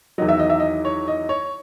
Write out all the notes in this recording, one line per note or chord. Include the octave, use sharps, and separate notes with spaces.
E2 D#3 F#3 D#5
E5
D#5
E5
D#5
C#5
D#5
C#5